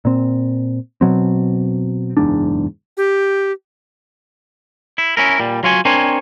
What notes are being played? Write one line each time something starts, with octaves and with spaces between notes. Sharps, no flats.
A#2 C4
B2 F#3 C4
F#1 E2 G#2 D4
G4
E4
C#4 E4 A#4
A#2 G3
F#3 F4 C#5 G#5
C4 D4 A#4 C5 C#5 G#5